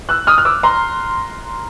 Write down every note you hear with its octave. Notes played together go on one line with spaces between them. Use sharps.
E6 F#6
D#6 F6
F6
D6 E6
A#5 C6